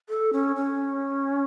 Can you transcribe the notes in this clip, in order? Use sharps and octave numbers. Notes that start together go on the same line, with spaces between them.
A4
C#4
C#4